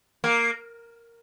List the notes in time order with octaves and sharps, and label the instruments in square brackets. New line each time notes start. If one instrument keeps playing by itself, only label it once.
[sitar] A#3